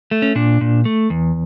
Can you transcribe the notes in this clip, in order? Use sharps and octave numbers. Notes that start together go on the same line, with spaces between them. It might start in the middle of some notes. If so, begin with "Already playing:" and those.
A3
C#4
A#2 D4
A#2
A3
E2